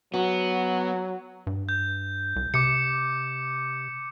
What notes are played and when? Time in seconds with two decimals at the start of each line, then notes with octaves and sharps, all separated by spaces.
0.14 F#3 B3 F#4
1.47 G2
1.69 G6
2.36 C2
2.54 C3 D6 C#7